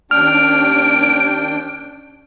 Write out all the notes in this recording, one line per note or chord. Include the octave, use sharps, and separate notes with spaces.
D#2 C#4 D4 G5 F6 D7